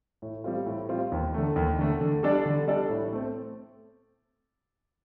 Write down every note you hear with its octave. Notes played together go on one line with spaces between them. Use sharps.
A2
G3 C4 F4
A2
G3 C4 F4
D#2
D3 A3
D#2
D3 A3
D3
G3 D4 A4 D5
D3
G3 D4 A4 D5
A2
A3 C4